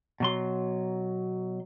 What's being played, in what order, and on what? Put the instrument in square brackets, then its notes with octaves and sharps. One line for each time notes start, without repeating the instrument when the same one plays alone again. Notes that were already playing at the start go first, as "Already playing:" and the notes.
[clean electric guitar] B2 F#3 C6